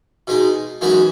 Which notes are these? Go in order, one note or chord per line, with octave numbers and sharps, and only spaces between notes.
B2 G#3 D#4
F#2 E3 G#3 D#4 F#4